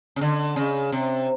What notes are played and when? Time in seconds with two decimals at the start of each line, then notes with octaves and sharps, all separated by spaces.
0.16 C#3
0.21 D3
0.56 C#3
0.92 C3